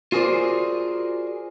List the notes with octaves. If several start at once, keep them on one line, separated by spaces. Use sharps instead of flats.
F4 F#4 G#4 A#4 C5 D5